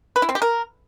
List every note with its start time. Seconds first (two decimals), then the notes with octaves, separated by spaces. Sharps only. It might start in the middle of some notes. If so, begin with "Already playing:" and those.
0.16 B4
0.22 E4
0.29 C4
0.35 G4
0.42 A#4